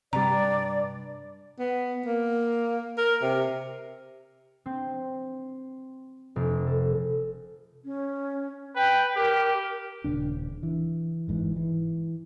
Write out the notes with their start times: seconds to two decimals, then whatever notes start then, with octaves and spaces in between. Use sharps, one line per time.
0.13 G2 C3 G3 D5 A#5
1.59 B3
2.06 A#3
2.98 A#4
3.22 C3
4.66 C4
6.36 F1
6.67 A4
7.84 C#4
8.76 B4 G5
9.16 G4 A#4
10.04 D#1 C#3 D4
10.63 E3
11.28 G1 G#2 E3
11.56 E3